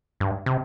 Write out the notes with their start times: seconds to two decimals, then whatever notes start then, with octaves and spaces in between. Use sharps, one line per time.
0.20 G2
0.46 C3